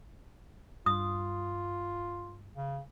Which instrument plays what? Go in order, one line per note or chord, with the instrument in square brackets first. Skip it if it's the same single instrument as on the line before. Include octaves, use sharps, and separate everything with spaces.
[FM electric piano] G2 [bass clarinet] F4 [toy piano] D#6
[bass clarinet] C#3